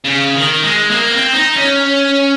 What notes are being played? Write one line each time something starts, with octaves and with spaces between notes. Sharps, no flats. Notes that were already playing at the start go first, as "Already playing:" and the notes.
C#3
D#3
G#3
A#3
C4
D#4
C#4